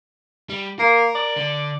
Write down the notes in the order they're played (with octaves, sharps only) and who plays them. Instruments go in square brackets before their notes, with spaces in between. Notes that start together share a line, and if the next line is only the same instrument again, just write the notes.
[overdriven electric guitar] G3
[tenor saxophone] A#3 [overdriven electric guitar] A#4
[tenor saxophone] D5
[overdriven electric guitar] D3